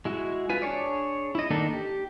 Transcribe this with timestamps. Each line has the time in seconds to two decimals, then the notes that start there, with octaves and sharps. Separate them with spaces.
0.05 G#3 E4 F#4
0.50 F4 B4 G#5
0.62 D4 G#4 C#5 D5
1.35 E4 D#5
1.50 D#3 A#3 D4 D#4 A4
1.73 G4